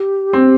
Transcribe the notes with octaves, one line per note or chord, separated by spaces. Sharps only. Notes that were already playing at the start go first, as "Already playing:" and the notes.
Already playing: G4
C4